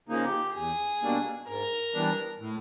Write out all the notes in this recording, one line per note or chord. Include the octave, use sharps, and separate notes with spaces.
C#3 F3 A#3 D#4
G4
E2 G#4
B2 G3 A#3 D4
G#2 A#4
E3 G3 B3 D4
A2